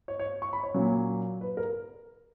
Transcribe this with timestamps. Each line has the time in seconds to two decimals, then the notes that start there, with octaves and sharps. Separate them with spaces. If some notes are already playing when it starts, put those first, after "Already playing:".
0.08 C#5
0.19 C#5
0.42 C#6
0.53 B5
0.63 C#5
0.74 A#2 F#3 C#4
1.41 B4
1.57 A#4